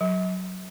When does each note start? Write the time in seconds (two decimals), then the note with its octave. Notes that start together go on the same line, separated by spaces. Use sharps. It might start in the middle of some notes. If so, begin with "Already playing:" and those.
0.01 F#3